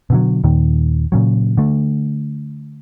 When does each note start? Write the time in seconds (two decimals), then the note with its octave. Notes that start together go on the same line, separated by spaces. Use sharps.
0.10 B2 D3 F#3
0.44 D#2 A#2 D#3
1.12 A#2 C#3 F#3
1.57 D3 A3